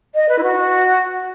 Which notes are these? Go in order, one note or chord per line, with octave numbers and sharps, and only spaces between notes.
D#5
B4
E4
F#4